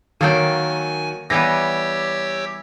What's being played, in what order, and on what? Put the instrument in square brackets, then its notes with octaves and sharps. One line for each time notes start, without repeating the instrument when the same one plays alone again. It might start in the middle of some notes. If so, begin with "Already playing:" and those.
[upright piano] D#3 F#3 [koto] A#3 A4 G5 [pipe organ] G#5
[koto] E3 G3 B3 [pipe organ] G4 C#5 E6 [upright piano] A#6